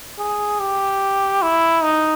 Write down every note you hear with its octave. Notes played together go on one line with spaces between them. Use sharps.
G#4
G4
E4
D#4